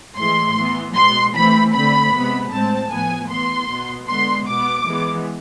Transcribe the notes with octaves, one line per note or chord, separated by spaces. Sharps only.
A2 E3 G#3 C6
E3 B3
B2 G#3 B3 C6
E3 A3 C4 B5
D3 A3 C4 B5
C3 G#3 B3
A2 G#3 C4 A5
A2 F3 B3 G#5
E3 B3 C6
B2 B3
D3 G#3 B3 C6
B2 B3 D6
E3 G#3 B3